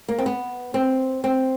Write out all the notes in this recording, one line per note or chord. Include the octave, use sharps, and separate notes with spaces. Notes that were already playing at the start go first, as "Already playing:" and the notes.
A#3
C4
B3
C4
C4